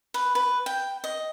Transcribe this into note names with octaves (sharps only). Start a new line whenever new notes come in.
B4
B4
G5
D#5